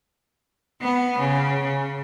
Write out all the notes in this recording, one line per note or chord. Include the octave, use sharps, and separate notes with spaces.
B3
C#3
C#3